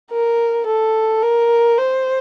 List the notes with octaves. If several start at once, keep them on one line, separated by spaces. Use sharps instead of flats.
A#4
A4
A#4
C5